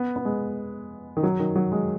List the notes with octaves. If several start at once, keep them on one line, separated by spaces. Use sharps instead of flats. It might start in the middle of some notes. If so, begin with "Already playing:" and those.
Already playing: B3
B3
G#3
D#3
F#3
D#3
F#3
G#3